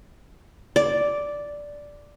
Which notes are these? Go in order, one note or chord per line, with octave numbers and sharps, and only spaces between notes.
D5